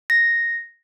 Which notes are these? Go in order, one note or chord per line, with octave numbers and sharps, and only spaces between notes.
A#6